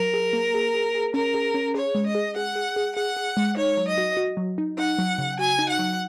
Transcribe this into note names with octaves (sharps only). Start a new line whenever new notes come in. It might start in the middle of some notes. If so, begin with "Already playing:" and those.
Already playing: F#3 A#4
G#4
A#3
G#4
G#4
G#4
C#4 A#4
G#4
C#4
G#4 C#5
G#3
D#5
G#4
G#4 F#5
G#4
G#4
G#4 F#5
G#4
G#3
D#4 C#5
F#3
D#5
F#4
F#4
F#3
D#4
D#4 F#5
F#3
C#3
F#4 G#5
D#4
F#5
F#3